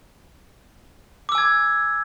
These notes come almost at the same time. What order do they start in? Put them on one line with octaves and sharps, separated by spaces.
D6 E6 G#5 G#6